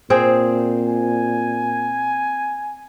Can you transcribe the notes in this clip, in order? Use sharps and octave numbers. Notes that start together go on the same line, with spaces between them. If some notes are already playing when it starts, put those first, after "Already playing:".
A#2 C4 G#4 C5
G#5